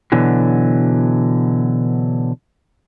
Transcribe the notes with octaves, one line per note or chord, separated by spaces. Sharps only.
B2 D3 E3 F#3